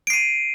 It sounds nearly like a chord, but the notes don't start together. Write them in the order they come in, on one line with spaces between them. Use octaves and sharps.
D7 C7 D#7